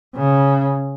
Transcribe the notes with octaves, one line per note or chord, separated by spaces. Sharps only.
C#3